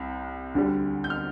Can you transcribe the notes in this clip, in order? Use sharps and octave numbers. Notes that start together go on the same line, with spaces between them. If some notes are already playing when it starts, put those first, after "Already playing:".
Already playing: C2 C3
D2 D3 G3
G6
F6